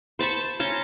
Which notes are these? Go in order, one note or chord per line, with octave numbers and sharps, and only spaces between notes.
C5 A5 B5 C#6
C#4 A5 A#5 C6